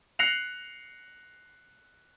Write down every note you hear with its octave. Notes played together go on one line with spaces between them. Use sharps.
F#6 A#6 C7 C#7 F7 F#7